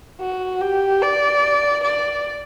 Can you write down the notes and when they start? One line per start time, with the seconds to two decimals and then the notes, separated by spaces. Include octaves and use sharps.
0.21 F#4
0.61 G4
1.02 D5
1.84 D5